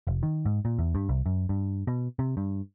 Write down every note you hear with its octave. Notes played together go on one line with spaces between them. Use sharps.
F1
D#3
G#2
A#2
E2
G2
C2
F#2
G2
B2
C3
G2